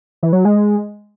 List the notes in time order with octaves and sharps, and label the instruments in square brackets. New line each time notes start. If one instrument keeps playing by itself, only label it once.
[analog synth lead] E3
F#3
G#3